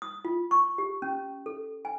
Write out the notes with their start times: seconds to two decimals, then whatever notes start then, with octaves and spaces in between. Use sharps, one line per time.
0.02 D#6
0.25 F4
0.51 C#6
0.78 G4
1.02 C#4
1.46 A4
1.85 G#5